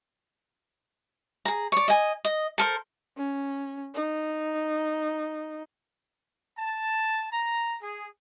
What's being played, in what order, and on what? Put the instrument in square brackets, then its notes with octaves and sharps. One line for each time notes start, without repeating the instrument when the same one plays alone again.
[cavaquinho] G#4 A#5
C#5 D5
D#5 G#5
D#5
A4 A#4 C5
[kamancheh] C#4
D#4
[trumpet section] A5
A#5
G#4